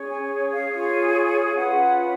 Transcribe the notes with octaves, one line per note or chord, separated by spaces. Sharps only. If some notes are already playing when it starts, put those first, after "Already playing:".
Already playing: C#4 G#4 C#5
G#5
F5
F4 G#4 C#5
F5
C#4 F4 B4 F#5